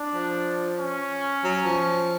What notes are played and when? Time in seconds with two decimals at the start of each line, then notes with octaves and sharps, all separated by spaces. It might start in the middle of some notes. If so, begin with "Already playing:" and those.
Already playing: D4
0.14 F3
0.79 C#4
1.44 F#3
1.65 F3